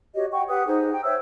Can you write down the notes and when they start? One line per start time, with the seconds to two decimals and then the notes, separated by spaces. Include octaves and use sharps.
0.14 F#4 G4 C#5 D#5
0.31 F#5 G5 C#6
0.48 G4 B4 F#5 D#6
0.66 D#4 G#4 C5
0.91 G5
1.04 C5 C#5 E5 E6